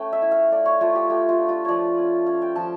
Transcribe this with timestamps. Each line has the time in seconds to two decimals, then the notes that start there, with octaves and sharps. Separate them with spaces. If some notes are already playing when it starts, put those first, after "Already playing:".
Already playing: A3 C#4 G5
0.13 E5
0.22 E4
0.32 F5
0.51 A3 D5
0.66 C#5
0.81 A3 F4
0.95 G4
1.10 A3 G4
1.29 F4
1.39 D4
1.49 F4
1.65 F3 C#5 D5
1.98 C#4
2.26 C#4 F5
2.42 G5
2.56 F3 A5